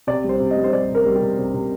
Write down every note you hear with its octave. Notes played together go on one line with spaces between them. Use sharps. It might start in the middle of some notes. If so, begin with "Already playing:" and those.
C3 D5
G3 C5
C3
D#5
G3
C5
G3 D5
C3
A#4
G3
G4
C3
C3
C3